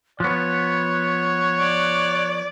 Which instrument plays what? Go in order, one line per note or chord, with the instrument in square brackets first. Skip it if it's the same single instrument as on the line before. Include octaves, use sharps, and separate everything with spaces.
[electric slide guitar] F3 B3 [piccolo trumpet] C#5 [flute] F#6
[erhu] D5